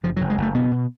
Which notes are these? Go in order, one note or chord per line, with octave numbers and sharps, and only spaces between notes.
F#1 F3
F#3
F#1
G#3
F#1 A3
B2 B3
B2